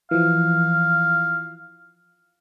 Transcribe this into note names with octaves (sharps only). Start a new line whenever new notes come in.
E3 F3 F5